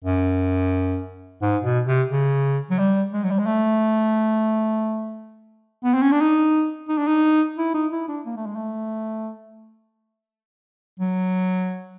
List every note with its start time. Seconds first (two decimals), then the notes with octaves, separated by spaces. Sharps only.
0.05 F#2
1.42 G#2
1.64 B2
1.87 C3
2.11 C#3
2.71 F#3
2.79 G3
3.13 G#3
3.24 F#3
3.31 G3
3.39 G#3
3.46 A3
5.84 B3
5.94 C4
6.02 C#4
6.12 D4
6.21 D#4
6.89 D#4
6.98 D4
7.07 D#4
7.58 E4
7.75 D#4
7.92 E4
8.08 D4
8.26 A#3
8.37 A3
8.46 G#3
8.56 A3
11.00 F#3